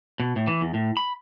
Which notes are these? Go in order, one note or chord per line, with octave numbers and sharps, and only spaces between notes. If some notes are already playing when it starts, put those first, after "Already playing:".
B2
A2
E3
E2
A2
B5